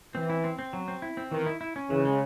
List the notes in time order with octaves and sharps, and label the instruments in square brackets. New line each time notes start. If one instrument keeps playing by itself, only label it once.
[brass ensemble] E3 [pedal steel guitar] C4
[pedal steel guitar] E4
C4
C4
F#3
C4
E4
C4
[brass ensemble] D#3 [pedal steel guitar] E3
[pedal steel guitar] E4
E4
C#4
[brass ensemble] C#3 [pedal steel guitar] E3
[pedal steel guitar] G#3